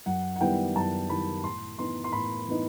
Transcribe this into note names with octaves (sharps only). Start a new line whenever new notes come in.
F#2 F#5
F#5
D#3 G3 B3 E4 G5
F#2 A5
D#3 G3 B3 E4 B5
A2 C6
E3 B3 D#4 C6
C6
A2 B5
E3 B3 D#4